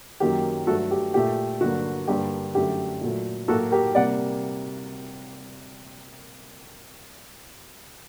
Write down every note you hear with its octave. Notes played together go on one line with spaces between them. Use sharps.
F#2 D#3 F#3 A#3 G4
G2 F#3 A3 F#4 A4
G4
A#2 A3 G4
G2 D3 F#3 A#3 F#4
G2 D3 G3 A#3 G4
F#2 D3 A3 G4
A#2 F#3 A3
A2 F#3 A#3 F#4 A4
G4 A#4
C3 G3 A#3 D5 F#5